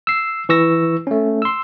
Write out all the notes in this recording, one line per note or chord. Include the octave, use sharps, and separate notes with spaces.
E6 C7
E3 C#6 E6 A#6
A3 C#4
C6 E6